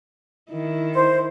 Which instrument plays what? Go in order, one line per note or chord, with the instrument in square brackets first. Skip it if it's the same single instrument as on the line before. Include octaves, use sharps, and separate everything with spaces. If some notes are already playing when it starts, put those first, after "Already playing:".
[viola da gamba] D#3 E4
[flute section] C5